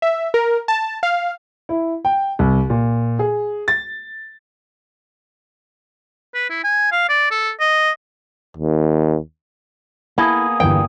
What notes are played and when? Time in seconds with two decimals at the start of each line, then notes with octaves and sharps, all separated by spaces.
0.02 E5
0.34 A#4
0.68 A5
1.03 F5
1.69 E4
2.05 G5
2.39 C2
2.70 A#2
3.19 G#4
3.68 A6
6.35 B4
6.50 E4
6.64 G#5
6.92 F5
7.09 D5
7.31 A4
7.60 D#5
8.57 D#2
10.18 A#3 B3 E4 G#4 A4
10.60 G1 E2 G2 G5